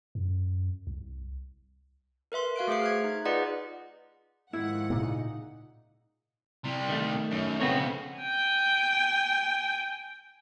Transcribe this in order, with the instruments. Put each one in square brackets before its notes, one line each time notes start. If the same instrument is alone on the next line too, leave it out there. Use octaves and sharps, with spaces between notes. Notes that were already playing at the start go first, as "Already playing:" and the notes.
[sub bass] F#2
C2
[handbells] A#4 B4 E5 C6
F#4 F5 F#6 D7
A3 G#4 C5 E5 C7
F6 F#6 G#6
D#4
F4 G#4 B4 D5 D#5 F#5
[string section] G#2 F#5 [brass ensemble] D#3 F3 [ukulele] E4
[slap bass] A#2 C#3 A#3 [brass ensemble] D#4
[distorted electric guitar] C3 G3
[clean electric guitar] D#3 A3
[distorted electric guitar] F#2
[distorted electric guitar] F2 C#3 [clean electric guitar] B3 C4 C#5
[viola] G5 G#5